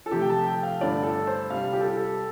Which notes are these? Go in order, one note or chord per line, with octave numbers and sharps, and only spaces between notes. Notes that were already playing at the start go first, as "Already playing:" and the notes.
A4
C3 F3 A3 G4
G5
A5
G5
F5
G2 D3 A3 D5
A4
C5
C3 G3 F5
G4
A4
G4
A4